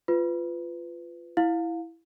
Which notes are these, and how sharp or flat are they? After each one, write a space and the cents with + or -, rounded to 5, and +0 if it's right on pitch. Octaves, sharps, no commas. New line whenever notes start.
F4 -10 B4 +20
E4 +0 F5 +20